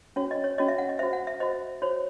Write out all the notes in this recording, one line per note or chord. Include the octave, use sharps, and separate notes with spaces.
C#4 F#4 C#5
D#5
C#5
C#4 F#4 C#5 D#5
E5
F#5
D#5
F#4 C5 E5
F#5
E5
F#4 C5 D#5
F#4 C5 C#5